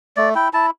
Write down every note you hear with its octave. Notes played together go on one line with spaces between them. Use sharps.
A3 D5
E4 G5
E4 A5